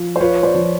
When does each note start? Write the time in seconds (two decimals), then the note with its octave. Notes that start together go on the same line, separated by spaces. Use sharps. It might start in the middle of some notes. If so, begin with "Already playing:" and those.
Already playing: F3
0.16 C5
0.20 F4 B4 C#5
0.43 C5 D5
0.55 F3